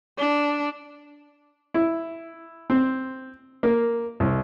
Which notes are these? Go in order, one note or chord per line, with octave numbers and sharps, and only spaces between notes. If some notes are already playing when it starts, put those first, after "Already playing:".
D4
E4
C4
A#3
C2